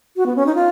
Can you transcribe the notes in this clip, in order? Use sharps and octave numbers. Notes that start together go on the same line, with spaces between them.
F#4
B3
C#4
D#4
F4